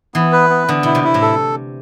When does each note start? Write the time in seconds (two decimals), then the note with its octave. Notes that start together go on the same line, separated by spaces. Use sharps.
0.14 E3 B3
0.32 B4
0.50 B3
0.68 D3 B3
0.83 B2 E4
0.95 C3
1.04 E4
1.14 A2
1.22 A4